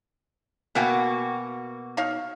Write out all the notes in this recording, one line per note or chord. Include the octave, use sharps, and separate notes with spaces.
B2 A#3 F#4 E5 G5 G#5
D#4 C#5 F5